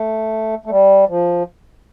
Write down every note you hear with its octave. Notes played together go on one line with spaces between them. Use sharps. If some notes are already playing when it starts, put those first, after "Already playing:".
Already playing: A3
A3
G3
F3